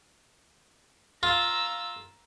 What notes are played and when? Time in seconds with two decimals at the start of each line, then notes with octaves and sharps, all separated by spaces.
1.23 F4 A#5 E6